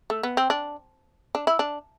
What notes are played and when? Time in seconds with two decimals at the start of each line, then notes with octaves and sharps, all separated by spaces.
0.10 A3
0.23 B3
0.37 C4
0.50 D4
1.35 D4
1.47 E4
1.59 D4